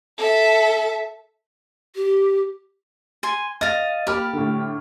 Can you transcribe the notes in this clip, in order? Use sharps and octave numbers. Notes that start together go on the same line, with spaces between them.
A4 E5
G4
G#5 C6
D#5 F5 A6
A#3 G4 B5 F6
A2 D3